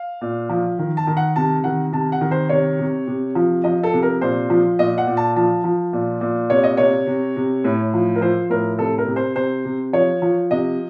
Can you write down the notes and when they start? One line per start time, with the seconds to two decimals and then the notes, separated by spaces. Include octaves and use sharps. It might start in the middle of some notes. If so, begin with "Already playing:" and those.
Already playing: F5
0.21 A#2
0.49 F3
0.79 D#3
0.97 A5
1.07 D#3
1.17 F#5
1.36 C3 A5
1.64 D#3 F#5
1.92 C3 A5
2.12 F#5
2.21 D#3
2.31 C5
2.49 C3 C#5
2.79 C3
3.07 C3
3.35 F3
3.64 F3 D#5
3.83 A4
3.93 C3
4.03 A#4
4.21 A#2 C5
4.50 F3
4.79 A#2 D#5
4.98 F#5
5.07 A#2
5.17 A5
5.36 F3 A5
5.64 F3
5.93 A#2
6.21 A#2
6.50 C3 C#5
6.64 D#5
6.77 C3 C#5
7.07 C3
7.36 C3
7.64 A2
7.94 F3
8.16 A#4
8.21 F3 C5
8.50 A2 A#4
8.79 C3 A4
8.98 A#4
9.07 C3
9.16 C5
9.36 C3 C5
9.65 C3
9.93 F3 C#5
10.22 F3
10.51 C3 D#5